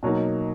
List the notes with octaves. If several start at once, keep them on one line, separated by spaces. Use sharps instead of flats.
B2 F#3 A#3 D#4